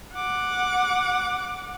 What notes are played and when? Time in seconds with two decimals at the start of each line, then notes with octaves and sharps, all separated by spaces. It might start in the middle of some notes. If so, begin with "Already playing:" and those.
0.15 F#5 D6